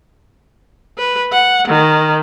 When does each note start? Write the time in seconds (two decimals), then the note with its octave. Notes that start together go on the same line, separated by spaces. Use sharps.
0.98 B4
1.32 F#5
1.68 D#3